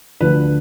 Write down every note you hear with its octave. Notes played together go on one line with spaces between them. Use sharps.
D2 D3 F3 B4